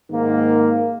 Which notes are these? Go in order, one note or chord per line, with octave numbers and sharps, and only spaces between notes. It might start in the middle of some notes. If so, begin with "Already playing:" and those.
G#2 D#3 A#3